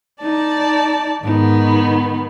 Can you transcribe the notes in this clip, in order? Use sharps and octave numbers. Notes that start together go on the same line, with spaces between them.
D#4 D5 A5
G#2 D#3 B3 D#4